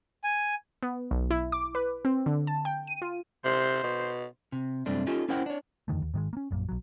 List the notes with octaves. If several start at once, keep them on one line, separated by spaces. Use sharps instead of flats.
G#5
B3
B1
E4
D6
B4
C4
D3
A5
G5
D#7
F4
C3 C5
B2
C3
F#2 C3 G3 A3 C4 D4
C#4 D#4 F4 G4 A4
C#4 E4 A#4 C5 F#5 G5
D4 C#5
F2 D3 D#3 A3
D#2
G#2 D#3 G3 G#3
A#3 C#4
A#1 F#2 A#2
B1 F#3